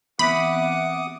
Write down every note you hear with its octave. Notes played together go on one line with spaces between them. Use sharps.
E3 B3 C4 E5 F#5 B5 D6 D#6